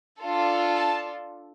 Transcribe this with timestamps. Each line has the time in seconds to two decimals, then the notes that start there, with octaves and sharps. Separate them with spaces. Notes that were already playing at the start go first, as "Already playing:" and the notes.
0.21 D4 F4 A4
0.76 A5